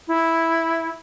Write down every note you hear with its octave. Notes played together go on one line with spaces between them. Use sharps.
E4